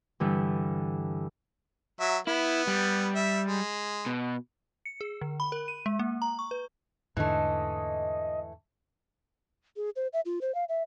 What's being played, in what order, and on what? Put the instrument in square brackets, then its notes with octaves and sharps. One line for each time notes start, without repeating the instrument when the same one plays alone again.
[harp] G2 D3 E3
[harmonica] F#3 E5
[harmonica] B3 [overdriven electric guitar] E4
[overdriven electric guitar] G3
[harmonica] E5
G#3
[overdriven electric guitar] B2
[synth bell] C#7
G#4
D3
B5
A#4
D#7
G#3
A#3
A#5
C#6
B4
[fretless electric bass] E2 G#2 D3 [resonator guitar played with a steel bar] E3 A3 [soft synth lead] D#5
[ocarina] G#4
C5
E5
F4
C5
F5
E5